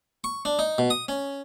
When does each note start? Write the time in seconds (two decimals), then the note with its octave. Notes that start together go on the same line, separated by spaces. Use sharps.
0.24 C#6
0.45 D4
0.59 D#4
0.78 B2
0.90 D#6
1.08 C#4